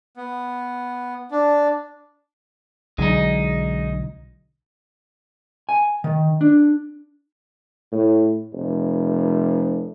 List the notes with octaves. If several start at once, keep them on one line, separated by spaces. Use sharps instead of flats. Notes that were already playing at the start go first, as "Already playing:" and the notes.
B3
D4
B1 D3 F#3 G#3 D#4
G#5
D#3
D4
A2
F1